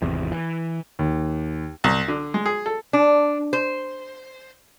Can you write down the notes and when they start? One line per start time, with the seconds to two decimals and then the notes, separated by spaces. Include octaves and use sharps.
0.02 G#1 E2 C3
0.32 E3
0.99 D#2
1.84 C2
2.08 D3
2.34 G#3
2.46 G#4
2.66 A4
2.93 D4
3.53 C5